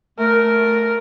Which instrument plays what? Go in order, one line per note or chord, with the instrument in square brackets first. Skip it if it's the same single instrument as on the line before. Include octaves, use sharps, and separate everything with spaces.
[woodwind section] A3 [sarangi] A#4